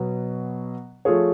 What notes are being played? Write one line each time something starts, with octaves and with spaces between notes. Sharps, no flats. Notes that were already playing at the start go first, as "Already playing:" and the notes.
Already playing: B2 F#3 B3
F3 A3 F4 G#4 C#5